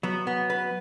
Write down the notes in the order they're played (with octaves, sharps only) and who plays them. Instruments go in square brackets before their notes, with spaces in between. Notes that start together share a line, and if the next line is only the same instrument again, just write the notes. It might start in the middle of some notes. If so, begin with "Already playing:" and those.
[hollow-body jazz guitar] F#3 [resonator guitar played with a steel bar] B3
[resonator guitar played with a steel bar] B3
B4